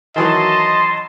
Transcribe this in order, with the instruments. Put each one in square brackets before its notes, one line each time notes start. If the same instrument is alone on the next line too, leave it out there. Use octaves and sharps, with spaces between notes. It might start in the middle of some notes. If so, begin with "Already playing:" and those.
[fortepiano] D#3 E3 F#3 [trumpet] D#5 [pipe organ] A5 C6